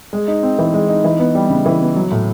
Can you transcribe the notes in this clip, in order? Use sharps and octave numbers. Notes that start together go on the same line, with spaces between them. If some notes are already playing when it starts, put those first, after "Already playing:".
G#3
D#4
C4
E3
G#3
D#4
E3
B3
G3
C#3
E3
B3
F#3
A2